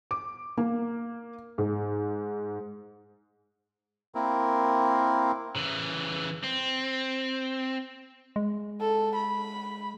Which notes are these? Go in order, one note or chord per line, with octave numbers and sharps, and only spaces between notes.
D6
A#3
G#2
A#3 C4 E4 A#4
C#3 E3
C4
G#3
A4
B5